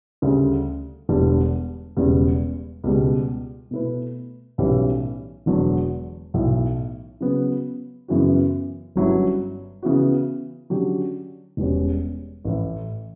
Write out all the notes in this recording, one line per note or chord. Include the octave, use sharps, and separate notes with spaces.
D2 C#3 G3
E1 E2 D3 G3
E1 E2 C#3 G3
C#2 B2 G3
B2 A3 E4 B4
B1 A2 E3 G3 C#4
E1 E2 D3 F#3
B1 A2 E3
C#3 F#3 B3
F#2 C#3 E3 B3 F#4
G1 G2 F#3 C#4 E4
C#3 E3 B3 F#4
D3 F#3 C#4 G4
E1 E2 B2 G3 C#4
A1 A2 E3